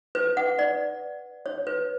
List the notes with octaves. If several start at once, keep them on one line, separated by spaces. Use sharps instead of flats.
B4
F#5
D5
C#5
B4